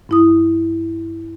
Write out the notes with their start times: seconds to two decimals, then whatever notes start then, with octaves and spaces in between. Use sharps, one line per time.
0.09 G2 E4 D#6